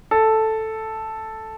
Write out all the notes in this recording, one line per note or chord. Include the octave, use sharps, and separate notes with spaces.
A4